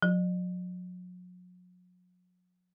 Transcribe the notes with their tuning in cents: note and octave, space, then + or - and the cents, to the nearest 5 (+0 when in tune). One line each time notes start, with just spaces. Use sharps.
F#3 -40